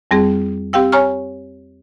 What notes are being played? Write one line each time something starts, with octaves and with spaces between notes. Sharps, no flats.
F2 G3 C4 G#4
C4 G4 F5 G5 E6
C#5 G#5 A#5 C#6 F6